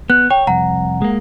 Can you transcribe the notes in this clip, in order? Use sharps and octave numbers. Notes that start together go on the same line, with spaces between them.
B3 F#6
C#5 G5
C2 F2 F#5 A#5
G#3 A#3